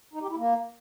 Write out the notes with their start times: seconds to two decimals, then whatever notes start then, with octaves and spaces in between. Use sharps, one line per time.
0.14 D#4
0.22 G4
0.30 E4
0.38 A#3